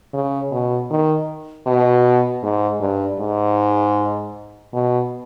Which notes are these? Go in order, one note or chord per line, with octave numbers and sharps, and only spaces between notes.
C#3
B2
D#3
B2
G#2
G2
G#2
B2